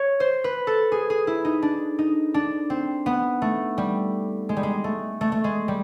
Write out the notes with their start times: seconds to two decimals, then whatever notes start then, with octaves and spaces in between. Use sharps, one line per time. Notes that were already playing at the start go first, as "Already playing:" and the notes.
Already playing: C#5
0.20 C5
0.44 B4
0.67 A4
0.92 G#4
1.10 G#4
1.27 E4
1.45 D#4
1.62 D4
1.99 D#4
2.34 D4
2.70 C4
3.06 B3
3.42 A3
3.78 G3
4.49 G#3
4.57 G3
4.63 G#3
4.84 A3
5.21 A3
5.32 A3
5.44 G#3
5.68 G3